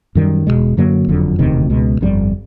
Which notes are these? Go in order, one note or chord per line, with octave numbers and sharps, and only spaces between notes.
F#2 D#3 G3
E1 E2 B2 G#3
F#2 D3 F#3 A#3
F#1 F2 D3 F#3
E1 D2 C3 D#3
C#2 B2 G#3
G1 F2 D3 G3